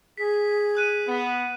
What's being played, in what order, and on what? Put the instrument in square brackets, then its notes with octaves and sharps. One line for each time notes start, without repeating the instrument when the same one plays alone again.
[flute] G#4 [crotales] B6
[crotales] D#6 F#6 D#7
[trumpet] B3 [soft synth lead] F#5